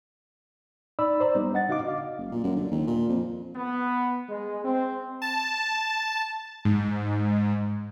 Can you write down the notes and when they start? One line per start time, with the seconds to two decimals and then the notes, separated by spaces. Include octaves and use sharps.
0.99 D#4 D5 B5 E6
1.20 C5 D5 A#5
1.35 G3 B3 D#4
1.53 D4 D#5 F#5 A6
1.68 C#3 D#4 F#4 D#5 F5 D6
1.84 D#5 F5
2.18 F#1
2.31 A#2
2.43 F#2
2.56 D3
2.71 D#2
2.87 A#2
3.09 F2
3.55 B3
4.29 G#3
4.65 C4
5.22 A5
6.65 G#2